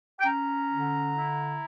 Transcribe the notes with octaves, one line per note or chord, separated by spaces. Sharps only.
G5
C#4 A#5
D3
E4